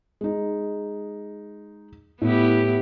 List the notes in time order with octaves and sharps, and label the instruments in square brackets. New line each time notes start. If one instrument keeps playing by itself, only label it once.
[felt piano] G#3 D#4
[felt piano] A2 [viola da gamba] B3 E4 G4